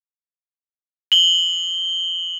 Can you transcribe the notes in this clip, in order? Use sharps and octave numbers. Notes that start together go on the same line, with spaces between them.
F#7 G7